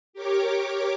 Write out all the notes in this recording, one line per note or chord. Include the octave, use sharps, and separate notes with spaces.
G4 A#4 C#5 D6